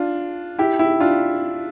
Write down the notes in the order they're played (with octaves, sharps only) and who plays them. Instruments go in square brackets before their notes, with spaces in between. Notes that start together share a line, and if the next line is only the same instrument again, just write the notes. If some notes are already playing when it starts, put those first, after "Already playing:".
Already playing: [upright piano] D4 F4
E4 G4
E4 G4
D4 F4